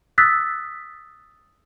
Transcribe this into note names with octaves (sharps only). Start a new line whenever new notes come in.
D#6 E6 F#6 A6 B6